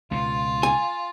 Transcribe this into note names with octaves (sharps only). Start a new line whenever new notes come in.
C#2 B2 F4
G#5